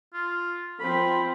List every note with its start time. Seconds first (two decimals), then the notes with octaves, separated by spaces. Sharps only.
0.13 F4
0.80 F3 C4 B5